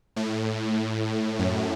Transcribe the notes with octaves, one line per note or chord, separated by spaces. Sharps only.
A2
F#2